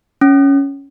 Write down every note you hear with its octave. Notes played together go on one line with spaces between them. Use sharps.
C#4